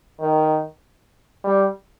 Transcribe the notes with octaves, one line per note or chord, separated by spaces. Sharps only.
D#3
G3